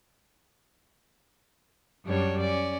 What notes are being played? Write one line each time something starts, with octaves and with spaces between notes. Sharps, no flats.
F#2 G3 D4 C#5
C#4 D5